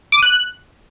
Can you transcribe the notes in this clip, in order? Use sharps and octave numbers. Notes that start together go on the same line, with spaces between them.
D6
D#7
F#6